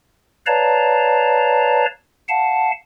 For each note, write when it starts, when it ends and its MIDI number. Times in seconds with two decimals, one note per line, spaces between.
0.46 1.85 71
0.46 1.85 73
0.46 1.85 74
0.46 1.85 77
0.46 1.85 81
0.46 1.85 82
2.29 2.71 77
2.29 2.71 78
2.29 2.71 81